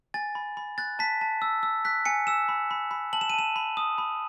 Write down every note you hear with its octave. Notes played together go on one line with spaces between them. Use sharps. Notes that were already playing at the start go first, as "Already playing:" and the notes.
G#5 A6
B5
B5
F#6 A6
A5 B6
A5
E6
E6
F#6 B6
G#5 C#7
E6 E7
B5
B5
B5
A5 F#7
E7
D#7
A5 E7
B5
D#6
B5